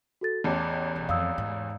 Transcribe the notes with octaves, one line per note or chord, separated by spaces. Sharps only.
F#4 A4 A6
A1 E2 A5 D6
E1
F2 F5 D#6 E6
G#2